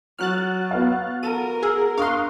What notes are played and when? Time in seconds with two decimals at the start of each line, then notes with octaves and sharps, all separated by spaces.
0.18 F#3 F6 F#6 A6
0.71 B3 F#4 F5
1.23 A#4 D#7
1.62 G#4 A#5 E6 F6
1.98 D4 F5 A#5 C6 C#6 D#6 F#6